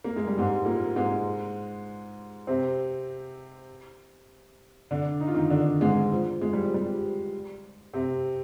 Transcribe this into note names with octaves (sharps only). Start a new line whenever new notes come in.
A#3
G#3
G3
G#2 G#3
A#2 A#3
G#2 G#3
C3 C4
D3 D4
D#4
F4
D#3 D#4
D3 D4
G#2 G#3
F3
G#3
G3
F3
G3
C3 C4